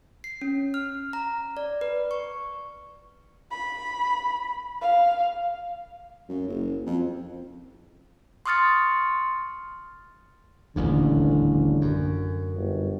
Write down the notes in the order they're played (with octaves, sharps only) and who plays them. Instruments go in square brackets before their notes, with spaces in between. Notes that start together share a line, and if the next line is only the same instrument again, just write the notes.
[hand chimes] C7
C#4
F6
A#5
D5
B4
C#6
[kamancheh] B5
F5
[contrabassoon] F#2
F#1
F2
[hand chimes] C6 C#6 D#6 F6 A6 C#7
[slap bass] D#1 A1 D2 [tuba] D3
[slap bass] F#2
[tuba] G1